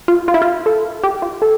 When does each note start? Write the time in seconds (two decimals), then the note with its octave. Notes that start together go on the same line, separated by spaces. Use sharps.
0.08 F4
0.28 F4
0.34 E4
0.42 F4
0.66 A4
1.04 G4
1.22 F4
1.42 A4